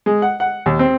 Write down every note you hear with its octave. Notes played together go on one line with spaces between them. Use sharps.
G#3
F#5
F#5
D#2
C4